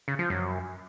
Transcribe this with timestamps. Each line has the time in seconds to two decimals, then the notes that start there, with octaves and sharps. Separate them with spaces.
0.08 C#3
0.19 F3
0.30 F#2